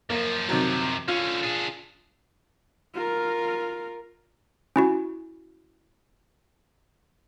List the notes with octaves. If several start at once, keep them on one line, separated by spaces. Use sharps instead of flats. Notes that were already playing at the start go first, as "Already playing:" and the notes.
F#2 F3 A#3
C3 D#3 F#3
D3 C#4 F4
D4 G#4
F4 A#4
C#4 E4 F#4